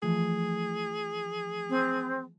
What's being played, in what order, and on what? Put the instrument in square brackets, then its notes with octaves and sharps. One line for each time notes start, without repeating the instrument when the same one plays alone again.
[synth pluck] E3 F3 A3 [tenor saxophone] G#4
[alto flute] C4